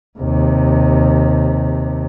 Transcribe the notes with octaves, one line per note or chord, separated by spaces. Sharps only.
D#2 C3